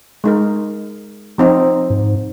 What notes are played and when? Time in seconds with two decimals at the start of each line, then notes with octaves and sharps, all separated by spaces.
0.24 G#3 D#4 A#4
1.38 F3 C4 D#4
1.90 G#2